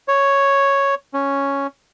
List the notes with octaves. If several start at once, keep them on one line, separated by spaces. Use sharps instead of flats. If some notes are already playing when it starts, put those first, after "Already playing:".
C#5
C#4